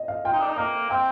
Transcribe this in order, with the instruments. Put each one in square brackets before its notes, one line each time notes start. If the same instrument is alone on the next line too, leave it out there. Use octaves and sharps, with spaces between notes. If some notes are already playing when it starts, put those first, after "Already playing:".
Already playing: [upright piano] D#5
F5
[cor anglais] F4 [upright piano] G5
[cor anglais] D#4
D4
D#4
[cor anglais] A#3 [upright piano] A#5
[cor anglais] C4 [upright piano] G5